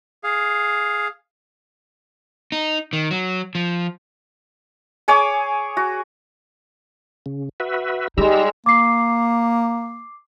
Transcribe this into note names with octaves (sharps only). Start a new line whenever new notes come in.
G#4 F5
D#4
D#3
F#3
F3
G#4 C#5 G#5 D6
F#4
C#3
F#4 B4 E5
G3 G#3 D#4 G4 A#5 E6
A#3 D6 C7